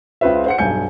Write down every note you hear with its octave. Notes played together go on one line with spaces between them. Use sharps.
C#2 C#3 F4 B4 C5 E5
C5 F#5 C#7
B1 G2 G#5 G6 C#7